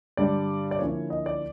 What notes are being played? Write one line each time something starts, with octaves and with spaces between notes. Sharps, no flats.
G2 D3 G3 D5
D5
D3 F3 A#3 C#4 E4 C#5
D#5
D5